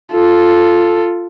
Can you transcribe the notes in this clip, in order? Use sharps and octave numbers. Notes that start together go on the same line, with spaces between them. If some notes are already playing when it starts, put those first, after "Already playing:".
F4 A4